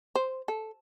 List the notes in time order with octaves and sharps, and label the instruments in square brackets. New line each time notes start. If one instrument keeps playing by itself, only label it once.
[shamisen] C5
A4